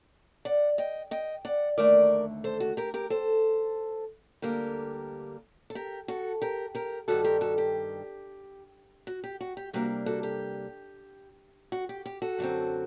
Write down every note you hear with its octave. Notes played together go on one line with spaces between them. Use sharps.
D5 F#5
D#5 G5
D#5 G5
D5 F#5
D#2 D3 A3 A#4 D5
A4 C5
F#4
G4 A#4
G4 A#4
A4 C5
D2 D3 G3 A#3 G4 A#4
A4
G4 A#4
F#4 A4
G4 A#4
G4 A#4
G2 D#3 G3 F#4 A4
G4 A#4
F#4 A4
G4
F#4
G4
F#4
G4
C3 G3 A#3 D4 F#4
F#4 A4
G4
F#4
G4
G4
F#4 A4
F#2 D3 F#3 C4